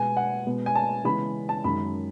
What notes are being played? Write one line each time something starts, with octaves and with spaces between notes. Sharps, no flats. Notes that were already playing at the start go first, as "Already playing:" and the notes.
Already playing: B2 G#3 B3 G#5
F#5
B2 G#3 B3
G#5
A5
C#3 E3 G#3 B3 B5
A5
F#2 D#3 G#3 B5